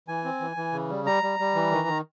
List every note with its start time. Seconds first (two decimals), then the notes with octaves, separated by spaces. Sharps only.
0.08 E3 G#5
0.24 C4
0.40 E3
0.57 E3
0.73 C#3
0.90 G3
1.06 G3 A#5
1.23 G3
1.40 G3
1.55 E3
1.71 D#3
1.88 D#3